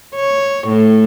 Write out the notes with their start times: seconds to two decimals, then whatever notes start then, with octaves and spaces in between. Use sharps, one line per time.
0.15 C#5
0.68 A2